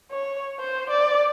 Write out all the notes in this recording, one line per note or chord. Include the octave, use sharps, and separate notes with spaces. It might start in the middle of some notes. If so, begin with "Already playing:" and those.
C#5
C5
D5